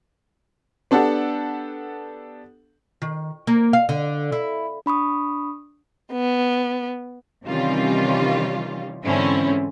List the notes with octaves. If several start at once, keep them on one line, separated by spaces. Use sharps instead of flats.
B3 D4 G4 A4 F#5
D#3
A#3
F5
D3
E4
D4 B5 C#6 D#6
B3
C3 D#3 E3 G3 C#4 F4
G#2 D3 E3 C4 C#4 E4